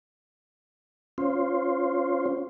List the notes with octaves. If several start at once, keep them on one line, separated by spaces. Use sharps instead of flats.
C#4 F4 C5